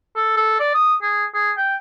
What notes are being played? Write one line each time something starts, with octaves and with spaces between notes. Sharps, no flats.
A4
A4
D5
D#6
G#4
G#4
G5